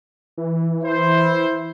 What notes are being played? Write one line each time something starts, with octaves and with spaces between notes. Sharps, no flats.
E3
E4 C5